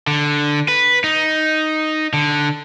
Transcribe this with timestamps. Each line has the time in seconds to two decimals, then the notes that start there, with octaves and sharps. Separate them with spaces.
0.07 D3
0.68 B4
1.04 D#4
2.13 D3